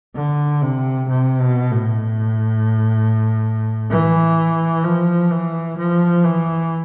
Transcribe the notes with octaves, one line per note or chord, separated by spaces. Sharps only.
D3
C3
C3
B2
A2
E3
F3
E3
F3
E3